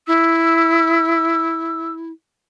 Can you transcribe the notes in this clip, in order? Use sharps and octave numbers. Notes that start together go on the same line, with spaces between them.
E4 E6